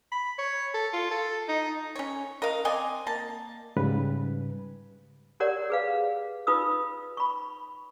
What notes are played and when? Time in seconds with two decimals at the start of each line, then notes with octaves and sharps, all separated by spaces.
0.12 B5
0.38 C#5
0.74 A4
0.93 F4
1.11 A4
1.48 D#4
1.96 C#4 C#5
2.42 A#4 D#5 F5
2.65 C4 D5 D#5 G#5
3.07 A#3 A5
3.76 G#2 C#3 G3 B4
5.40 G4 A#4 C#5 D5 F#5
5.70 G#4 B4 F5
6.47 D#4 F4 B4 D#6 E6
7.17 B5 C#6